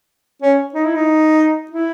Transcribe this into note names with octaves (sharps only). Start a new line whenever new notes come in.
C#4
D#4
E4
D#4
E4